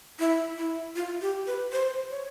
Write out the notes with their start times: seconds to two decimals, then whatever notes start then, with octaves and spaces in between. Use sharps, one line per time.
0.19 E4
0.57 E4
0.96 F4
1.22 G4
1.47 B4
1.72 C5
2.11 C#5